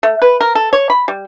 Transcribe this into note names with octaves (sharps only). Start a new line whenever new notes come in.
A3
B4
A#4
A4
C#5
B5
G3